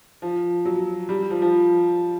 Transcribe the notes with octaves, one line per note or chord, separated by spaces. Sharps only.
F3
F#3
G3
F3
F3